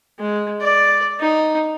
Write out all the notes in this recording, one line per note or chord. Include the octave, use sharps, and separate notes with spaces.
G#3
D5
D#4